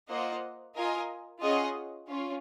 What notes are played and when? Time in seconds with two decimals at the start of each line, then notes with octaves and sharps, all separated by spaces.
0.09 A#3 F4 C5 D#5 F#5
0.75 F4 A#4 D#5 G#5
1.42 C#4 F4 G#4 D#5 F#5
2.08 C#4 F4